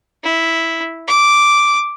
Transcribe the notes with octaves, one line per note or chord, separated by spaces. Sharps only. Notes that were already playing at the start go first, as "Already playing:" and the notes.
E4
D6